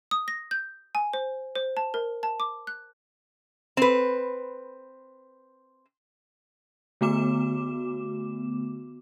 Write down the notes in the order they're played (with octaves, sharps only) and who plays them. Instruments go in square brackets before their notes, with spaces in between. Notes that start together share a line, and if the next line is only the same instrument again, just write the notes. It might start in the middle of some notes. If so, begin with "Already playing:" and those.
[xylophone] D#6
A#6
G6
G#5
C5
C5
A5
A#4
A5
D6
F#6
[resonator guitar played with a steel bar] C4 B4
[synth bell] D3 A3 B3 F#4 D6 E7